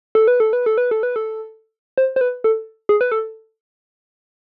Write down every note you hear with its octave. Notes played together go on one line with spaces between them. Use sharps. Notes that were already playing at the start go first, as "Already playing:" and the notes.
A4
B4
A4
B4
A4
B4
A4
B4
A4
C5
C5
B4
A4
G#4
B4
A4